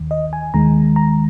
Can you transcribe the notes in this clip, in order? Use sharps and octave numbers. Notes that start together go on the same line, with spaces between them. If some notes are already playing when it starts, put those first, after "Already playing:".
Already playing: D#2 D#3
D#5
G#5
D#2 D#3 G#3 A#5
A#5